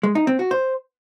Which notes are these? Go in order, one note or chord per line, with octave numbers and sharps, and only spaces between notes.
G#3
D#4
C4
F#4
C5